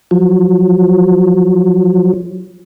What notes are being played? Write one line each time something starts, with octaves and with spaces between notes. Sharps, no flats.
F3 F#3